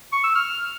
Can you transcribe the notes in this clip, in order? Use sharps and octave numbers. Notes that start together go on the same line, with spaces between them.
C#6
E6
F6